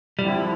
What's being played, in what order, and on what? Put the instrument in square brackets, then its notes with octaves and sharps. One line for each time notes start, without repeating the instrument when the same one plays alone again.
[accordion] D3 F3 C4 E4 [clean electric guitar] G3